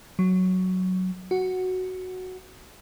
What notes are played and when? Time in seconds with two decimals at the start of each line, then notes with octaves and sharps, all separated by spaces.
0.19 F#3
1.31 F#4